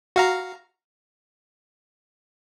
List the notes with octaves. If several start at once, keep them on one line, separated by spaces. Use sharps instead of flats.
F#4 F5 A#5